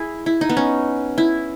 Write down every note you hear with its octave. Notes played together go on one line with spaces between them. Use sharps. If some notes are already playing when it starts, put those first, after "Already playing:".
Already playing: E4 G#4
E4
D#4
B3
C#4
E4